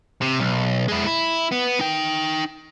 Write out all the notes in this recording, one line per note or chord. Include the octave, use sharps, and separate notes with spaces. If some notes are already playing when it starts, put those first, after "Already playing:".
C3
B1
G#3 E4
E4
B3
D#4 G5